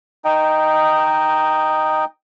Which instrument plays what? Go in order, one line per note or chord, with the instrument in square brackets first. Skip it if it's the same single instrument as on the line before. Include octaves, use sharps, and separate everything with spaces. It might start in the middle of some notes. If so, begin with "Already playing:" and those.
[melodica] D#4 D#5 G5